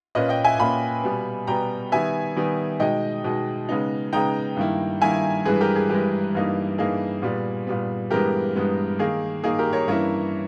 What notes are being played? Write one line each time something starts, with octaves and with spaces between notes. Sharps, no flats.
A#2 A#3 C#4 B4 D#5
D#5 G5
E5 G#5
A#2 A#3 C#4 G#5 B5
B2 G3 B3
B2 G3 B3 G5 A#5
D#3 G3 B3 E5 G#5
D#3 G3 B3
B2 G#3 D#4 D#5 G5
B2 G#3 D#4
C#3 G#3 B3 D#4
C#3 G#3 B3 D#4 G5 A#5
G2 D#3 A#3 E4
G2 D#3 A#3 E4 E5 G#5
G2 E3 G#3 G#4 B4
G4 A#4
G#4
G2 E3 G#3 G4
G2 E3 A#3 D#4
G2 E3 A#3 D#4 G#4
A#2 G3 B3
A#2 G3 B3
G2 E3 G#3 B3 G4 A#4
G2 E3 G#3 B3
D#3 A#3 D#4 G#4
D#3 A#3 D#4 G#4
G4 A#4
A#4 C#5
G2 E3 A#3 C#4 E4 A#4 C#5